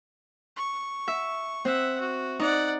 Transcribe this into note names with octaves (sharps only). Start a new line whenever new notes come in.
C#6
E5
C4 E5 F#5
F#4
D#4 D5 F#5